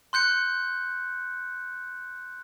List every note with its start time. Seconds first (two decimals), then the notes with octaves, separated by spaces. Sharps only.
0.13 C6 F#6 G6 C#7